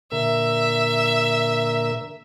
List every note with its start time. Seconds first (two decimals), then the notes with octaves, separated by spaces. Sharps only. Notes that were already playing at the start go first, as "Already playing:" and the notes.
0.12 A#2 D3 A#4 E5